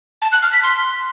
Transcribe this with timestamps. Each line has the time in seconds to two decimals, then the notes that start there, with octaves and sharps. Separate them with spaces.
0.22 A5
0.32 F#6
0.42 F6
0.53 B6
0.63 C6